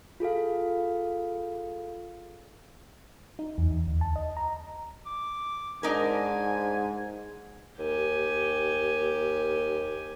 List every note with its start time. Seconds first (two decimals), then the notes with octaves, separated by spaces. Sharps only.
0.20 F4 G#4 A4 F5
3.39 D#4
3.58 E2
3.70 E2
3.87 D2
4.01 A5
4.16 D#5
4.37 A#5
5.06 D6
5.83 G#2 D4 D#4 A#4 G#5
7.79 D#2 G4 G#5